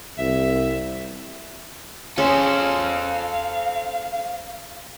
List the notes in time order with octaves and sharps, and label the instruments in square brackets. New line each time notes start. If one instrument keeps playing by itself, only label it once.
[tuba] C2 [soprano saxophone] E5
[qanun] C#4 G#4 [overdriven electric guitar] A4 C5 [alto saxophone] F5